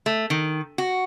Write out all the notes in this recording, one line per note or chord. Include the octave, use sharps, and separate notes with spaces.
A3
D#3
F#4